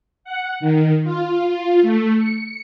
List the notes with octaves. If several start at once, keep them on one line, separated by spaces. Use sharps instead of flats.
F#5
D#3
F4
F4
A3
C#7